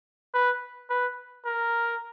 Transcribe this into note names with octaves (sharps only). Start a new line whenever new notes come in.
B4
B4
A#4